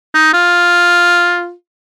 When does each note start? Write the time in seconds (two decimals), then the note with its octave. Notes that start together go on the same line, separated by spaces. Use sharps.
0.14 D#4
0.34 F4